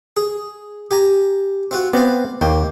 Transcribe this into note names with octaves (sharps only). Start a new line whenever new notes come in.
G#4
G4 G#5 A#5
C4 F4 F#4
B3 C4 D5 F5
D#2 A#3 G5